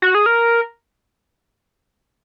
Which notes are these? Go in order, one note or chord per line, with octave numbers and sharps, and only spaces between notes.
F#4
G#4
A#4